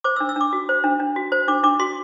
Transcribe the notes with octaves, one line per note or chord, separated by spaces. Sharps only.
C5 D6
E6
D4
E6
D4 D6
F#4
C5
D4
D4
F#4
C5
D4 D6
D4 D6
F#4 C6